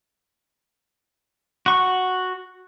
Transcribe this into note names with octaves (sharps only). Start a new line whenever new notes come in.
F#4 C#6